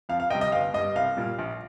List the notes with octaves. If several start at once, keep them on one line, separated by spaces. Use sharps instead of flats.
F2 F5
F5
C3 G3 D#5 G5
D#5
G1 F5
G2 G3 D#5
C2 F5
A#2 G3
A#1